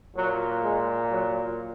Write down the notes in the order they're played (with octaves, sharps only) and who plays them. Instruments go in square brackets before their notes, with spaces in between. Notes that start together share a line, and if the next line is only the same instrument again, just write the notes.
[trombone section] A#2 F#3
G#3
F#3